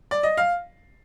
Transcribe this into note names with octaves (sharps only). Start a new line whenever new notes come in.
D5
D#5
F5